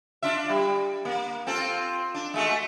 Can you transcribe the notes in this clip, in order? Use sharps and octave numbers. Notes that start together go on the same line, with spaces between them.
D4 F4 E5
G3
A#3
C4 F4 A4
D4
G#3 A3 F#4